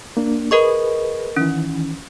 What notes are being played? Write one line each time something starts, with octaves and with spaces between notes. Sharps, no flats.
A#3 D4
G#4 A#4 B4 D#5 C#6
D#3 E3 C#4